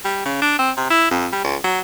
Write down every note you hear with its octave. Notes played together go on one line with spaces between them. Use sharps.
G3
C#3
D4
C4
C3
E4
F2
G3
C#2
F#3